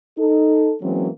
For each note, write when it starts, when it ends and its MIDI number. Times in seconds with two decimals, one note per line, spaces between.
0.18 0.73 63
0.18 0.73 69
0.82 1.08 52
0.82 1.08 54
0.82 1.08 56
0.82 1.08 58
0.82 1.08 60
0.82 1.08 61